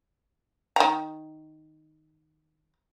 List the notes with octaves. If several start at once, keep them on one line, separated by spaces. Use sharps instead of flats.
D#3 A#5